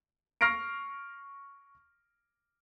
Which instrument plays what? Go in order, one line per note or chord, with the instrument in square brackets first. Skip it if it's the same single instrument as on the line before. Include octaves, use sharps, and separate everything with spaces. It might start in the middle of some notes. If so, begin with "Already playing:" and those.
[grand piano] C#6 F6 A#6 C7 D7